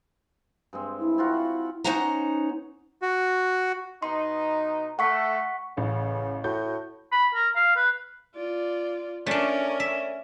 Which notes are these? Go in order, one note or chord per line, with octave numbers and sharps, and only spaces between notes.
G2 G#3 C4
E4
C4 F4 F#4
B3 C#4 D#4 C5 F#5 A#5
F#4
B2 B3 D#4 C6
A3 F#5 C#6 B6
A1 C#3
A2 F#4 G6
B5
A#4
F5
B4
F4 D5
A3 C#4 D4 A#4 C#5 D5
E5